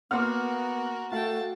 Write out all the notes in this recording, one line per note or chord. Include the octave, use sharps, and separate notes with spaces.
A#3 B3 F#4 A#4 F#5 C6 D6 F6
A3 F#4 F5 G5 A5